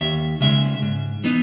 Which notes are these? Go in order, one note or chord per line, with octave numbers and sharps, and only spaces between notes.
D#2 E5
C#3 G#3 E5
G#2
E3 B3 D#4